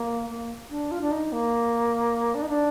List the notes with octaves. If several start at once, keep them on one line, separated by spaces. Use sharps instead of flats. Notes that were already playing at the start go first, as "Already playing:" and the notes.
Already playing: A#3
A#3
D4
F4
D4
D#4
A#3
D4
D#4
D4